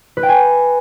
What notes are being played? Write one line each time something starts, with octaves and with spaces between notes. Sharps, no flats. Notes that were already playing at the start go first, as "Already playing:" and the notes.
B4
G5
G#5